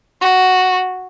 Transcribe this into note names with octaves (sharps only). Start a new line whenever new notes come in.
F#4